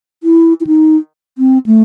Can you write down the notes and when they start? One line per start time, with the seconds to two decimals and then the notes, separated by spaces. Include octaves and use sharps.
0.23 E4
0.61 E4
0.67 D#4
1.38 C4
1.66 A3